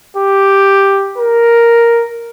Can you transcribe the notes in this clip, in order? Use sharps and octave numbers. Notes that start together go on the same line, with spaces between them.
G4
A#4